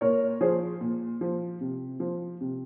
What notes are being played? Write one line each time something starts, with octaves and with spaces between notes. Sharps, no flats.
A#2 A#4 C#5
F3 G#4 C5
A#2
F3
C3
F3
C3